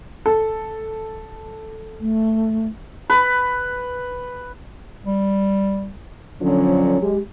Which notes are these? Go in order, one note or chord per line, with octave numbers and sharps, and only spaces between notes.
A4
A3
B4
G3
D3 F3 F#3 C#4
G#3 G4